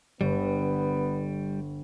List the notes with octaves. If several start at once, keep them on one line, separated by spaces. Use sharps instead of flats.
G1 G3 B3